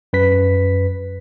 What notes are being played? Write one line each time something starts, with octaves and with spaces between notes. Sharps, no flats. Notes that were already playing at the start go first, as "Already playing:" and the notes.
F#2 B4 B6